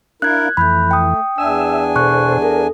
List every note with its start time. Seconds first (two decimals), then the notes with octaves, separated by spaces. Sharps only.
0.22 D4 E4 A#4 F5 F#6 G#6
0.57 F2 E3 A3 B5 F#6 G6
0.91 G5 D#6
1.38 E2 D4 E5 G#5 E6
1.96 B2 A4 C5 C#6 F#6
2.42 A4 A#4